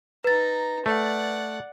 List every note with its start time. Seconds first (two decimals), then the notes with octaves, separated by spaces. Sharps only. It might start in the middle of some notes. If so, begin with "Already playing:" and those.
0.24 D#4 B4 A#5 A6
0.86 A3 D5 F#5